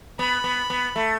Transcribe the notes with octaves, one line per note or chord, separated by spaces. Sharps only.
B3 B5
B3
B3
A3